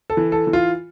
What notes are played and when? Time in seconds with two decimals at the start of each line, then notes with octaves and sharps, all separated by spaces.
0.10 A4
0.17 E3
0.32 A4
0.47 E3
0.53 F4